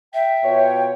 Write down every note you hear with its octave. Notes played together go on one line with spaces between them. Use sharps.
E5 G5
B2 F4 C#5